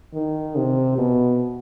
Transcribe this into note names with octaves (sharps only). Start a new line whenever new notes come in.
D#3
C3
B2